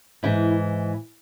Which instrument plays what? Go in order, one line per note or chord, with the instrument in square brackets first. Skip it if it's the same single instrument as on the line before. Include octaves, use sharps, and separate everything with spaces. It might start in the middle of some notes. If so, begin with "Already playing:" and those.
[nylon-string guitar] G#2 E3 E4